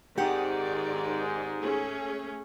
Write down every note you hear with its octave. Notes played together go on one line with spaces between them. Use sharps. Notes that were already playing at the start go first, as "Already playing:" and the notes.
G#2 D#3 C4 G4 D5 F#5
A3 C#4 G#4